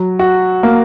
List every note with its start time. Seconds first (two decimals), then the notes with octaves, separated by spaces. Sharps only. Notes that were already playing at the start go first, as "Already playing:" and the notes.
Already playing: F#3
0.19 F#4
0.63 A#3